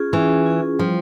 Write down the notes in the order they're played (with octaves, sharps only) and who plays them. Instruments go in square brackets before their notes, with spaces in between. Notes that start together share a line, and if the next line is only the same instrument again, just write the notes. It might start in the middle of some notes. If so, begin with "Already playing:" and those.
Already playing: [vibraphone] C#4 F4 G#4
[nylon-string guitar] E3 [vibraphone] C#4
[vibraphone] F4 G#4
[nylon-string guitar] F3 [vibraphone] G3